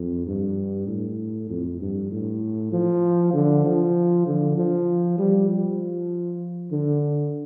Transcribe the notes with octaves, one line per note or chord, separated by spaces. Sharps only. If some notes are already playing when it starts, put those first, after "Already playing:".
Already playing: F2
G2
A2
F2
G2
A2
F3
D3
F3
D3
F3
G3
F3
D3